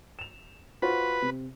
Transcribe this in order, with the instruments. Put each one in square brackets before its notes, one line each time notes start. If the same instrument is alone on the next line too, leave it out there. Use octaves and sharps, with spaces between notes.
[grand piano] E7 F7
[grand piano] F4 F#4 C5 [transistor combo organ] B4
[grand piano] C3